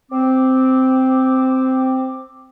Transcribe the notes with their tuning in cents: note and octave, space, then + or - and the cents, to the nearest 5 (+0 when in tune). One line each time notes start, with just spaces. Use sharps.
C4 -5 D6 +0